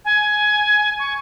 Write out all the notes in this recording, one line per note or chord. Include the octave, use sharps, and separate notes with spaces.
G#5
C#6